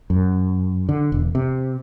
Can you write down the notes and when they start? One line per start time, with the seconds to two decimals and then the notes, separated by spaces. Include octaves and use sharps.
0.10 F#2
0.89 D3
1.12 E1
1.35 C3